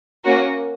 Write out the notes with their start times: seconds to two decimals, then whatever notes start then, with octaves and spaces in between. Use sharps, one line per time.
0.23 A#3 C#4 F#4 A#4